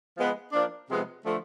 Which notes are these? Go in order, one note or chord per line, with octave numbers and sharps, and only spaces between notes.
F3 G#3 B3
F3 A#3 D4
C3 F3 G#3 B3
D3 F3 A3